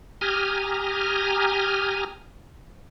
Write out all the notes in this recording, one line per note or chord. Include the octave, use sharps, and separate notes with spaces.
G4 G#5 A#5 D#6 F6